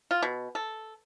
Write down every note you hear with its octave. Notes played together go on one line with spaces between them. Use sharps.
F4
B2
A4